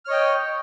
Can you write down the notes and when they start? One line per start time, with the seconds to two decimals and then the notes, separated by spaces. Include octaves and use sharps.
0.05 F6
0.08 C#5
0.10 D#5
0.13 G5